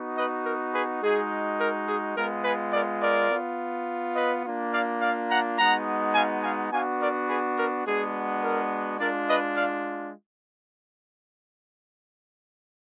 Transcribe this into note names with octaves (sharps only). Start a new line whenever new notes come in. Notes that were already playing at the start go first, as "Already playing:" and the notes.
Already playing: B3 D#4 F#4
B4 D#5
A#4
G#4 B4
G#3 D#4 F#4 G#4
A#4
G#4
G#3 B3 F4 A#4
G#4 B4
A#4 D5
A#4 D5
B3 F4
B4 D#5
A#3 D4 F4
D5 F5
D5 F5
F#5 A#5
G#3 B3 D#4 F#4 F#5 A#5
F5 G#5
F5 G#5
B3 D4 F#4 F5 G#5
A#4 D5
G#4 B4
A#4
G#3 B3 D4 F#4 G#4
A#4
G#3 D4 F4 A#4 D5
B4 D#5
D5 F5